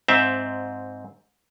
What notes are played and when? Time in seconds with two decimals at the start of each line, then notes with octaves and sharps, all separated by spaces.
0.08 G#2 C4 E5